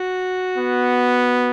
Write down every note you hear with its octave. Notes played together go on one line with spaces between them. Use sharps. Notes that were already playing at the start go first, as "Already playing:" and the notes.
Already playing: F#4
B3